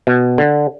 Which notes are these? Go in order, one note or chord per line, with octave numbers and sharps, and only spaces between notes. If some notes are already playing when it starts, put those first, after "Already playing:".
B2
D3